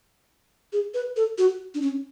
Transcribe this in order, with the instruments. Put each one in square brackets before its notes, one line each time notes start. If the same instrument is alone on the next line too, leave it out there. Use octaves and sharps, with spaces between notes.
[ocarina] G#4
B4
A4
F#4
D4
C#4